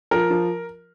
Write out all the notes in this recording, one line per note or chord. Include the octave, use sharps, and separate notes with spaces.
F3 A#4
F3